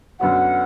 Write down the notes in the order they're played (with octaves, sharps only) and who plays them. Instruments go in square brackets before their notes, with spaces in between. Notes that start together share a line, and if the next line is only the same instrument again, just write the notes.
[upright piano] F#2 D3 B3 F#4 [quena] F#5